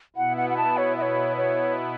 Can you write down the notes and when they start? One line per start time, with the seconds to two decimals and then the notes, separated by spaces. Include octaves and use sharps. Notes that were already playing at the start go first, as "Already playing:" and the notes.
0.16 B2 B3 E4 F#5
0.37 F#5
0.50 F#5
0.57 A5
0.77 C#5
0.97 E5
1.02 C#5
1.37 C#5